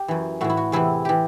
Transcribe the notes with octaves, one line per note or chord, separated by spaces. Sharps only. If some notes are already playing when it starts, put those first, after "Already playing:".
Already playing: G4
F#2 E3
A2 E3 F#4
E4
F#4
E2 C3 E3 E4
E3 G4